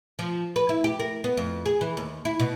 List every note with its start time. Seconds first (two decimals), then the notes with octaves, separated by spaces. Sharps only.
0.19 F3
0.56 B4
0.69 E4
0.84 G4
0.99 A#4
1.24 B3
1.37 F2
1.66 G#4
1.81 E3
1.97 D#2
2.25 E4
2.40 B2